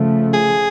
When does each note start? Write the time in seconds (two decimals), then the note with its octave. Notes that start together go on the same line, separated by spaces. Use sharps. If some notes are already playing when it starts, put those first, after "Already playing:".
Already playing: C#3 F3 A3
0.34 G#4